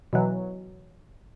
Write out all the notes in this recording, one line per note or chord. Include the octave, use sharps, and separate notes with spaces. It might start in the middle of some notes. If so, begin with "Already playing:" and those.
B2 E3 F#3